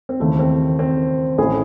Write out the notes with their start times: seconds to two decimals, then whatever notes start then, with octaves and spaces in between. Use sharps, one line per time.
0.09 C4
0.20 D#2 C#3 E3 A3
0.39 C4
0.79 C4
1.38 A1 A2 E3 G#4